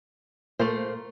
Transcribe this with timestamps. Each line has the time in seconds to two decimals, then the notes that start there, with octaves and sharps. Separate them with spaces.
0.59 A#2 A3 A#3 C5